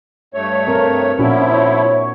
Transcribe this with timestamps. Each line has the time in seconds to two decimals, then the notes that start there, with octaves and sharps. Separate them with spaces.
0.34 G2 A3 C#5
0.67 C4 A#4
1.19 A#2 F3 C#4 D4 E4 F#4
1.53 C#5